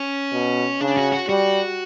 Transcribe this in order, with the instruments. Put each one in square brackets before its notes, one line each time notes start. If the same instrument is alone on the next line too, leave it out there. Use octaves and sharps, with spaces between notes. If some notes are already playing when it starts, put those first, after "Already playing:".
Already playing: [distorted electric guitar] C#4
[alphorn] B2
[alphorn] C#3 [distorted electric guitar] D4
[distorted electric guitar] F#4
F#4
[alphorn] G3 [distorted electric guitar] F#4